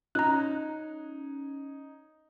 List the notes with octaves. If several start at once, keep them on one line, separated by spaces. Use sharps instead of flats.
C#4 D#4 A#5 F#6